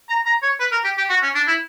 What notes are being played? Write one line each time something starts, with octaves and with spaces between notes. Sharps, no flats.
A#5
A#5
C#5
B4
A#4
G4
G4
F#4
C#4
D4
E4